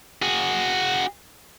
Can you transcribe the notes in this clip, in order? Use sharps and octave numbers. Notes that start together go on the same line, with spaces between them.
F#4 G#4